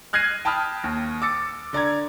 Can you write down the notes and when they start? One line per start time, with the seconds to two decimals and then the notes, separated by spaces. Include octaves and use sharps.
0.13 F6 F#6 G#6 A#6 C7 D#7
0.45 G5 A5 B5 D#6 F6
0.84 D#2
1.22 D6 E6 A6 C#7
1.73 D3 D5 A#5 G#6